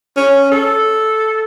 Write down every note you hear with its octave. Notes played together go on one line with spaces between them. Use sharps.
C#4
A4